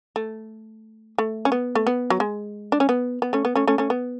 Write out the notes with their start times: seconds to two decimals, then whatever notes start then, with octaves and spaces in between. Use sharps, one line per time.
0.16 A3
1.18 A3
1.45 C#4
1.52 B3
1.75 A3
1.87 B3
2.10 F#3
2.20 G#3
2.72 D4
2.80 C#4
2.89 B3
3.22 B3
3.33 A3 C#4
3.45 B3
3.56 A3 C#4
3.67 A3 C#4
3.78 A3 C#4
3.90 B3